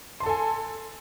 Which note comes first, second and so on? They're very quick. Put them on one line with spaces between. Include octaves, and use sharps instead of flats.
C6 A5 A4 G#5